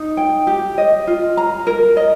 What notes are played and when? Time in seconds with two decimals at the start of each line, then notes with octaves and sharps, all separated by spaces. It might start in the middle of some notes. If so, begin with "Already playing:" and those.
Already playing: D#4
0.17 G5
0.47 G4
0.78 D#5
1.07 F4
1.37 A#5
1.67 A#4
1.97 D#5